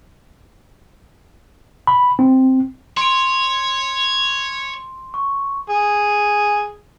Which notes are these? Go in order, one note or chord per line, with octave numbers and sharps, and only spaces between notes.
B5
C4
C#5 C6 D7
C#6
G#4